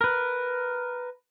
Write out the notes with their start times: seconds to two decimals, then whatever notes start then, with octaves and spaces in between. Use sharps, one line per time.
0.01 A#4 B4